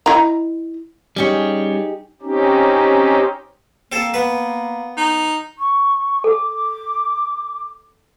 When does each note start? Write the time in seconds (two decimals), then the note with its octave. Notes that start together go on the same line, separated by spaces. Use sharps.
0.06 E4 D#5 A#5
1.16 G3 C#4 D#4 G4 G#4 C#5
2.22 C4 C#4 D#4 G4
3.92 A#3 C4 A4
4.14 B3 B4
4.98 D#4
5.59 C#6
6.24 A4 D6